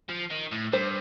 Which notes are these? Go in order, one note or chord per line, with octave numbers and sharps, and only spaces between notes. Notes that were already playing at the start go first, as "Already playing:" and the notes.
F3
D#3
A2
G2 C5